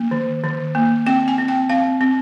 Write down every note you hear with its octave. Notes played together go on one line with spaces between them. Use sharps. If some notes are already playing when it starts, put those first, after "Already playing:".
Already playing: A#3
D#3
D#3
A#3
C4 G5
G#5
C4
G5
C4 F5
C4